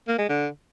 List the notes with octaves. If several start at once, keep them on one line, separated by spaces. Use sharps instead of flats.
A#3
G#3
D3